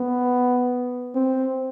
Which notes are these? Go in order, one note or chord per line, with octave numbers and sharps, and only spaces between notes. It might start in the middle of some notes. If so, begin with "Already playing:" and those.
Already playing: B3
C4